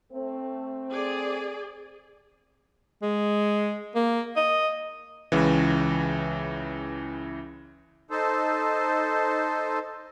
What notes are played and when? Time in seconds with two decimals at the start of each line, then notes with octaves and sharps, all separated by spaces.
0.13 A3 C4
0.92 G#4 D5
3.02 G#3
3.95 A#3
4.36 D#5
5.32 C#2 C#3 E3
8.11 D#4 A4 C5